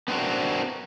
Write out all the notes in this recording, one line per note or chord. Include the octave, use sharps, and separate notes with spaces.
B3 C4 D4 F#4 A#4